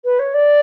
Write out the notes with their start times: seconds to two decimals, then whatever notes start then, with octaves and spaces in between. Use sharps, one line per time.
0.05 B4
0.19 C#5
0.34 D5